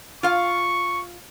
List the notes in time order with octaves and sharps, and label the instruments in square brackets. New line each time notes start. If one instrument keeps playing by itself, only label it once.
[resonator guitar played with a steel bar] F4 F5 [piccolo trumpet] C#6